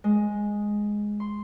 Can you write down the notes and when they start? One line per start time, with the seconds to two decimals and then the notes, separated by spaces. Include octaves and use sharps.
0.04 G#3
1.20 C6